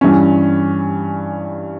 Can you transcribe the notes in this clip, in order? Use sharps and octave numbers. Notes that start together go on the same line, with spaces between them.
G2 E3 G3 C#4